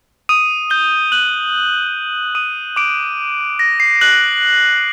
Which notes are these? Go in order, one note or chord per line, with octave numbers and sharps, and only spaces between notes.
D#6 D#7
G6 G7
F#6 F#7
D#6 D#7
D6 D7
A#6
C7
F#6 F#7